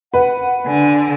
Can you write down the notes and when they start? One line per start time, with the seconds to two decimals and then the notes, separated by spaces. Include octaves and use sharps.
0.14 B4 F#5
0.66 D3 G#5